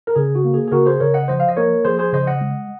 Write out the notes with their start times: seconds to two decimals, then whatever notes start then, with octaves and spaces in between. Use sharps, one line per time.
0.07 A#4
0.16 C#3 G#4
0.35 F#4
0.44 A#3
0.54 G#4
0.67 G#4
0.72 C#3 F#4 A#4
0.86 G#4 C5
1.00 C#3 A#4 C#5
1.14 D#5 F#5
1.28 F3 C5 D#5
1.40 F5
1.49 D#5
1.57 A#3 A#4 C#5
1.84 F3 G#4 C5
1.99 G#4 C5
2.13 C#3 C5 D#5
2.27 D#5 F#5
2.41 G#3